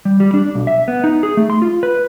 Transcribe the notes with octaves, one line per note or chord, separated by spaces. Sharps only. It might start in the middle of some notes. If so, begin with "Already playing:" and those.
G3
G3
D4
B1
E5
B3
D#4
G#4
A3
C6
F4
B4